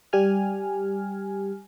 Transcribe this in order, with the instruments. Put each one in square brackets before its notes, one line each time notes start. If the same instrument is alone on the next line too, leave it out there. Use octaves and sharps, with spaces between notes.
[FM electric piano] G3 G4 G#5 F6